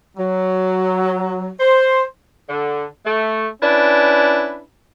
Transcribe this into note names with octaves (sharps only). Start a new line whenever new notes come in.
F#3
C5
D3
A3
C#4 D4 E4 B4